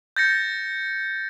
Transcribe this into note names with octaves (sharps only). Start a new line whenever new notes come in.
G6 A6 A#6 C#7